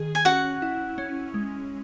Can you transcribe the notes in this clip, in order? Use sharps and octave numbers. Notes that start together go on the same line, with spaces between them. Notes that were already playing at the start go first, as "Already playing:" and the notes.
Already playing: D#3 G#4
G#5
C#4 F#4 F#5
E4
C#4
G#3